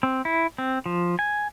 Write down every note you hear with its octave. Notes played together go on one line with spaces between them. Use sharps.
C4
E4
C4
F3
G#5